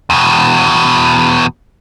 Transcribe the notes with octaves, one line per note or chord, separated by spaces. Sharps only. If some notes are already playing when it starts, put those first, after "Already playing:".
E2 B2